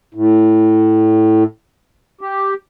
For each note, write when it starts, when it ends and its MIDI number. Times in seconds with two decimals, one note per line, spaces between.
0.14 1.43 45
2.21 2.54 67